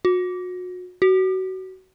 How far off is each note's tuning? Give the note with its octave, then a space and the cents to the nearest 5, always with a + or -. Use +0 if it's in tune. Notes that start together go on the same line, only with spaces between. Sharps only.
F#4 -35
F#4 +25